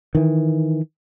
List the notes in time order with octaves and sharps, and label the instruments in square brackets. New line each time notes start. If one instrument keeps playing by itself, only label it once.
[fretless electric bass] D#3 E3